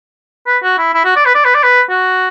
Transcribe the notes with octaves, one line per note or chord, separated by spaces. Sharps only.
B4
F#4
E4
E4
F#4
D5
B4
D5
B4
D5
B4
F#4